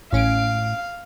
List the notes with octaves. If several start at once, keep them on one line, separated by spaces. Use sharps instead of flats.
A1 A2 C#4 F5 D7